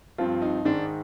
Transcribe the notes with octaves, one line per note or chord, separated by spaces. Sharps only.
G2 F3 C4 F4
D#4
G#2 D#3 G#3 D4